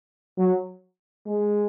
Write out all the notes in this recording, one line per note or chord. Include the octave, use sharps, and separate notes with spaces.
F#3
G#3